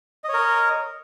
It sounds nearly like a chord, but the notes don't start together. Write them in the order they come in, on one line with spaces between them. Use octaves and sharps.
D#5 C#5 A#4